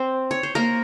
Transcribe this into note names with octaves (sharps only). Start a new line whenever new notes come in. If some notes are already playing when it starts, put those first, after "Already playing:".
Already playing: C4 C5
C#5
C5
A#3 A#4